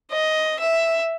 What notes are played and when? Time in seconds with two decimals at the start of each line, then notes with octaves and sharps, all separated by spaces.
0.12 D#5
0.59 E5